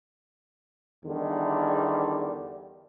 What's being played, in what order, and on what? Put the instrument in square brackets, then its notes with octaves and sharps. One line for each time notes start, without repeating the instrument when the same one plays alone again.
[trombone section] E2 D3 D#3 G3